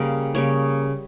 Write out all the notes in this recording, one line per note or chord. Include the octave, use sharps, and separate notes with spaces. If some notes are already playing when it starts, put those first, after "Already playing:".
Already playing: C#3 G3 A#3 F5
C#3 G3 A#3 C#5